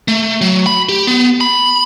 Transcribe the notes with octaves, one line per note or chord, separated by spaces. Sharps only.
A3
F#3
B5
G4
B3
B5